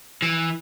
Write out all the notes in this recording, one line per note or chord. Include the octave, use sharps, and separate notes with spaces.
E3